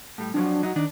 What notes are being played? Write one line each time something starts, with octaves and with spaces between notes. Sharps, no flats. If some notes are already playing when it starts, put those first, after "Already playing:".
A2 G3
F2 F3 F#3 D4
F#3 D#4
D#3 D4 D#4